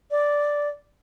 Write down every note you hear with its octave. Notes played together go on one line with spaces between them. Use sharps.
D5